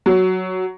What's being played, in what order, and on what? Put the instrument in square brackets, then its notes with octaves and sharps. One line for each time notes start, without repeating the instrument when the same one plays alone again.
[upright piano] F#3